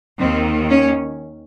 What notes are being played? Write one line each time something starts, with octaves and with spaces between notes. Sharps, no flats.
D#2 D#3 C4
C#4